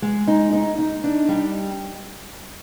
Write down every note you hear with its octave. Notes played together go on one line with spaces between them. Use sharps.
G#3
D#4
D#4
D#4
D4
G3